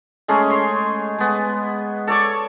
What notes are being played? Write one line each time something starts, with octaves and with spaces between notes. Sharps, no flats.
G#3 A3 C#4 G#4
C#5 C6
G#3 B3
A4 C#5 D5 C#6